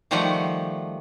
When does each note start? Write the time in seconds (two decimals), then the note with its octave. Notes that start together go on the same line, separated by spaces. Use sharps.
0.11 D#3 F3 G3 A3 F#4 F#5